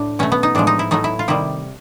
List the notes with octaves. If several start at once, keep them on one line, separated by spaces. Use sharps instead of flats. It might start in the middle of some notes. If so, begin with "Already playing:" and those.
Already playing: A2 D4
B2 F#3 A3 C#4
B3
D#4
A2 F3 G#3 D4
D#4
E4
A2 F#3 A3 D#4
E4
F4
C3 D#3 G3 E4